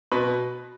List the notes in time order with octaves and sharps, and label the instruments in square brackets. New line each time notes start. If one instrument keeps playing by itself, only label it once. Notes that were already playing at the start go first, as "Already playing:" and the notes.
[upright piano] B2 B4